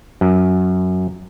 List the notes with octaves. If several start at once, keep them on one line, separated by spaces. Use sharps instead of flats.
F#2